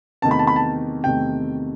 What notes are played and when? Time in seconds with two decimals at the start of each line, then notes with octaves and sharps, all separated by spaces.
0.22 E2 C3 D#3 A3 A5
0.31 B5
0.39 A5
0.47 B5
0.56 A5
1.03 E2 C3 D#3 A3 G5